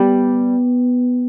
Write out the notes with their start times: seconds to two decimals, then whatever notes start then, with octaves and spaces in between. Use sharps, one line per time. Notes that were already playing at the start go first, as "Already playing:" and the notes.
Already playing: G3 B3